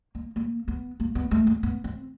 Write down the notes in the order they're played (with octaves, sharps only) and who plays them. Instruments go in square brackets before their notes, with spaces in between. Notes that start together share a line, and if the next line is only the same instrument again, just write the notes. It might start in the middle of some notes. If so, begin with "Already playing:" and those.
[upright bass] A#3
A#3
B3
A#3
B3
A3
A#3
B3
C4